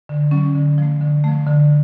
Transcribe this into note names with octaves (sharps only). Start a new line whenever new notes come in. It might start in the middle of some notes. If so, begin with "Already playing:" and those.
D3
F#3 C#4
D3
F3 A3
D3
F3 A3
D3